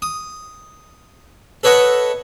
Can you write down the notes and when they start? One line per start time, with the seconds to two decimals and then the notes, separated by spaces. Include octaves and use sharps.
0.02 D#6
1.63 A4 B4 C#5 D#5 F#5